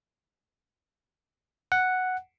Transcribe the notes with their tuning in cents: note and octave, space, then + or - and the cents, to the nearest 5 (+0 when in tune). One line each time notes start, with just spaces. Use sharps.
F#5 +0